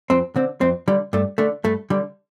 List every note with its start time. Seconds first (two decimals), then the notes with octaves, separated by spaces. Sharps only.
0.10 F2 C4
0.36 D3 C4
0.61 F2 C4
0.88 D3 G3
1.13 G2 A3
1.38 D3 A3
1.64 G2 A3
1.90 D3 G3